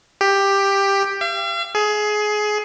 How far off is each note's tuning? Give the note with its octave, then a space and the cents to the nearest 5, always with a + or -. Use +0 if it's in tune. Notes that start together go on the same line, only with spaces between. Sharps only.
G4 +10
F5 -45
G#4 +20